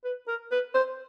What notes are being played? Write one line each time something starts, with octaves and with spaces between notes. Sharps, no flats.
B4
A#4
B4
C5